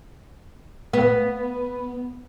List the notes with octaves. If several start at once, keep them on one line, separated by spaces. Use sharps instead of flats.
B3